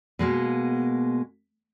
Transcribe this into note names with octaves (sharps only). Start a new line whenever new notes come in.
B2 G#3 A#3 B3